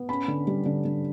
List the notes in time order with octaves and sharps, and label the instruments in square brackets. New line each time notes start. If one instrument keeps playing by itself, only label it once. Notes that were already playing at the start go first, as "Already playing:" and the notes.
Already playing: [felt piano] B3
C#4 B5
D3
G3
D3
D3